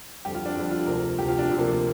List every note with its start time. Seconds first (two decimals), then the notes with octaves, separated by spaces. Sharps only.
0.25 F2 D3 G3 G4
0.35 F4
0.46 D4
0.55 F2 D3 G3 F4
0.71 F4
0.86 D2 C3 F3 A#4
1.17 D2 C3 F3 G4
1.28 F4
1.39 D4
1.49 D2 C3 F3
1.59 A#3
1.70 A#3